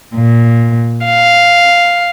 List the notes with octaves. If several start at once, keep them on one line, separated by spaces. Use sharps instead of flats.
A#2
F5